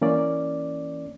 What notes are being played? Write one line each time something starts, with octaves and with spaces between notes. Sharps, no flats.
E3 A#3 C#4 D5